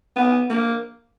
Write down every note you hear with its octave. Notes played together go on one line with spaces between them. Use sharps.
B3
A#3